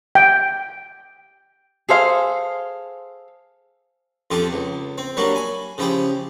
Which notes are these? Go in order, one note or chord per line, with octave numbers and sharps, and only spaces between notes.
G5
G#4 A4 C5 F5
F2 C3 F4 G4 A4
C#2
C4
F#3 G3 A#3 D4 F#4
G#5 B5
C#3 F3 E4 G4 G#4